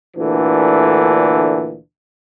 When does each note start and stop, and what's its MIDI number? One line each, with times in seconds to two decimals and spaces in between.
0.17 1.77 38
0.17 1.77 46
0.17 1.77 50
0.17 1.77 52